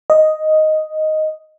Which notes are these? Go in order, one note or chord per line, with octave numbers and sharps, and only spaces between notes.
D#5